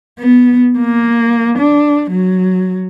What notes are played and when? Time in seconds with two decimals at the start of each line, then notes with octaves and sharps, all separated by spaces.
0.20 B3
0.79 A#3
1.58 D4
2.11 F#3